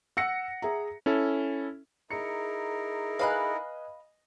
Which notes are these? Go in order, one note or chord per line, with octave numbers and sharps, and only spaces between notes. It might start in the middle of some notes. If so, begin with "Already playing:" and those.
F#5 E6 A#6 C#7
G#4 E5 A#5
C#4 E4 A4
D#4 E4 G#4 A#4 C#7
B4 D#5 F5 G#5 B5 F#6